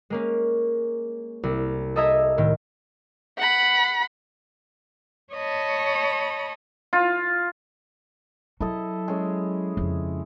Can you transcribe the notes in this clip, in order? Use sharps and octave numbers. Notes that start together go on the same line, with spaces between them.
G#3 A#3 C#4
C2
A4 D#5 E5 A#5 D#6 G#6
A2 D#3
F#5 B5
C#5 D#5 A5 B5
F4
F#3 E4 A4 D#5
G#3 C#4
F2 C#3